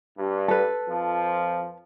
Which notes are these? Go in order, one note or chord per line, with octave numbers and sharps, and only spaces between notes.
G2
A4 B4
F2 F3